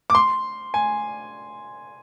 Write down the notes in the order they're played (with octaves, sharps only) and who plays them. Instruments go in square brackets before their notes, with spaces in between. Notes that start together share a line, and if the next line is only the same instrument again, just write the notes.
[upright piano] D6
C6
G#5